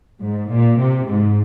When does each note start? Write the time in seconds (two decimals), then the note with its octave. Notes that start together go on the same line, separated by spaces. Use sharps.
0.21 G#2
0.51 A#2
0.79 C3
1.07 G#2